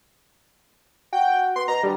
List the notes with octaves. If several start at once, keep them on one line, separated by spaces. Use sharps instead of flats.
F#4 G5
B3 C6
B2 A#5
D3 G3